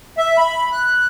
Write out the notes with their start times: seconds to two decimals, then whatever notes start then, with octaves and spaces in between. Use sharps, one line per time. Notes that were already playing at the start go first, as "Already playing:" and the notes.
0.18 E5
0.38 B5
0.72 F#6